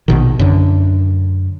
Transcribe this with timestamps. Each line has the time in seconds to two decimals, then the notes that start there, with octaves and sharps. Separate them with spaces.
0.08 A#1 B2 D#3
0.39 F#2 D3